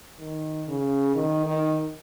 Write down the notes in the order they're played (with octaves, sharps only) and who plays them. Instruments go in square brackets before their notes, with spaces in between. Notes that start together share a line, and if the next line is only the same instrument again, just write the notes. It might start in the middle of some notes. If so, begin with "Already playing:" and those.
[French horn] D#3
C#3
D#3
D#3